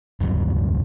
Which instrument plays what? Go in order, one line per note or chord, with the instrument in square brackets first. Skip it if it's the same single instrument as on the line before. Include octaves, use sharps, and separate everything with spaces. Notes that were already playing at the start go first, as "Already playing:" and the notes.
[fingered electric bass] F1 D2 G2 F#3